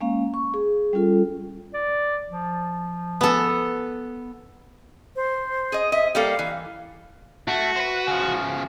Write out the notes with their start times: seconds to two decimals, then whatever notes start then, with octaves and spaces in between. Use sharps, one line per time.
0.01 G#3 A#3 C#4 F5
0.34 C#6
0.54 G#4
0.93 G3 C#4 F4 A4
1.74 D5
2.28 F3
3.21 B3 A4
5.16 C5
5.72 G#4 D#5
5.92 D#5 E5
6.15 G3 A#3 A4 F5
6.39 E3
7.48 A3 F#4
7.76 B4 C5
8.07 C#3 F3